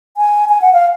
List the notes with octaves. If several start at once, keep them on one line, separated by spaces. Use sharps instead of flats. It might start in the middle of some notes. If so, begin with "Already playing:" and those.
G#5
G#5
F#5
F5